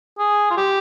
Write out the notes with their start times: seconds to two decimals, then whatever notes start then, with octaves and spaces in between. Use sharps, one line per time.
0.19 G#4
0.51 F4
0.57 G4